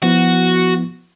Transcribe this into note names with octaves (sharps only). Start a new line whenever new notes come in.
F3 B3 E4 F#4